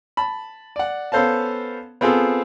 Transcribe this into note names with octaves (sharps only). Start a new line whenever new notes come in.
A5 B5
D5 F#5
B3 C#4 A4 C5 F5 A5
B3 C4 F4 G#4 A4